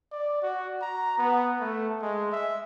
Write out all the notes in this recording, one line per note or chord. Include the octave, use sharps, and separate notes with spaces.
D5
F#4
A#5
B3
A3
G#3
E5